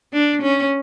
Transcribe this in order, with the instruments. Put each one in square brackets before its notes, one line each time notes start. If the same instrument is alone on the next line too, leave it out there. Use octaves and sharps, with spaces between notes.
[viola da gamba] D4
C#4